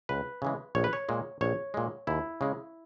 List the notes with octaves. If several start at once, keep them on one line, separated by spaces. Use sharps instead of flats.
C#2 B4
C#3 E3 G#3
A#1 C#5
B4
C#5
A#2 G#3
A#1 C#5
A#2 G#3
D#2 E4
C#3 G#3